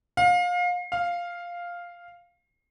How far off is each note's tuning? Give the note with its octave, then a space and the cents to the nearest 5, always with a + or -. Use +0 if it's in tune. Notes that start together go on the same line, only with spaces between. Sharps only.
F5 +30
F5 +0